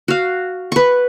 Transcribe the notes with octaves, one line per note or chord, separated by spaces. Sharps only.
F#4 F5
B4 C#6